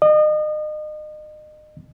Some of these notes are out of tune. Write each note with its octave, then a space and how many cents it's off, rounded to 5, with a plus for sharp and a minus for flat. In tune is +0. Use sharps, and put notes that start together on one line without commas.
D#5 -35